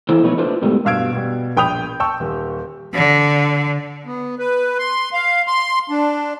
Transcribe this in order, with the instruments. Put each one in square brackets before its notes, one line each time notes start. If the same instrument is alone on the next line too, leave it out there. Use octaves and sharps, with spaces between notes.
[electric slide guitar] E3 A#3 E4 A4 C5
B2 F3 A3 D#4 B4 C#5
A3 D4 F4 B4 C5
G#2 B2 D#3 G3 A3
[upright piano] G2 B2 F5 E6 G#6 D7
B2 G3
A#1 G5 B5 D#6 G6 F7
G5 A5 C#6 E6
D#1
[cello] D3
[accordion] B3
B4
C6
F5
C6
D4